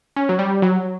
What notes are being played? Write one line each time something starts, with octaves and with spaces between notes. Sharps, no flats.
C#4
F#3
G3
F#3